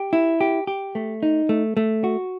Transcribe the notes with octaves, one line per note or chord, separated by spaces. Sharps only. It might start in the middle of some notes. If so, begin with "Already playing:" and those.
Already playing: G4
E4
G4
G4
A3
D#4
A3
A3
F#4